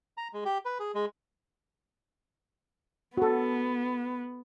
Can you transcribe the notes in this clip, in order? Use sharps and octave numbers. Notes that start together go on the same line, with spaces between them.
A#5
G#3
G4
B4
G#4
G#3
B3 F#4 A4